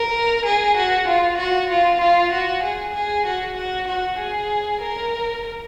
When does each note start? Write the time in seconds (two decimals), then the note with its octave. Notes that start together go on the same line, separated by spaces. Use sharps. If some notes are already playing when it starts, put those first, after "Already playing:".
Already playing: A#4
0.45 G#4
0.77 F#4
1.08 F4
1.38 F#4
1.70 F4
2.01 F4
2.32 F#4
2.63 G#4
2.94 G#4
3.26 F#4
3.57 F#4
3.88 F#4
4.19 G#4
4.81 A#4